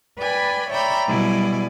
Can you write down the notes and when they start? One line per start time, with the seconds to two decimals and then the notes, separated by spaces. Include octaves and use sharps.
0.18 B4 D5 G5 G#5 B5
0.70 C#5 D5 E5 G5 A#5 B5
1.07 B2 F#3 G3 E4 D5 G#5